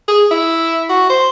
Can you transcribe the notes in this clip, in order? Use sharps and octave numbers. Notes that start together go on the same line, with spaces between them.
G#4
E4
F#4
C5